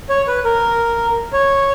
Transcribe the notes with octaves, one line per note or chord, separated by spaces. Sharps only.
C#5
B4
A#4
C#5